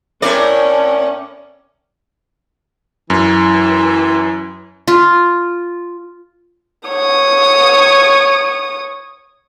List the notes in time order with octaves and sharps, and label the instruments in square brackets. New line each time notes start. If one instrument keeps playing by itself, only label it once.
[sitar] A2 A#4 D5 [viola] C#4
[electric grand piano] F#2 [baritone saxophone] E3
[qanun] F4
[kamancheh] C#5 D#6